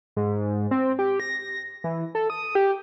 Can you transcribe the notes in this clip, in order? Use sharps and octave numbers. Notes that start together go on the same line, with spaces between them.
G#2
C4
G4
A#6
E3
A4
D#6
G4